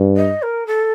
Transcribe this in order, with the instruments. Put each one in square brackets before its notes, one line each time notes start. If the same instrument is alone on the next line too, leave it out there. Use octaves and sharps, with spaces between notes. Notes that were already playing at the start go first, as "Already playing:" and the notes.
Already playing: [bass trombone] G2
[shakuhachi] D#5
A#4
A4